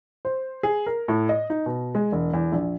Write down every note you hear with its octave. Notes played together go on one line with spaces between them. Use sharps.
C5
G#4
A#4
A2
D#5
D#4
B2
G#3
E1
E2
A#1